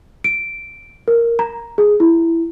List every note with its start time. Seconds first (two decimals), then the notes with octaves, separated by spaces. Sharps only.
0.24 D7
1.08 A#4
1.39 A#5
1.78 G#4
2.00 E4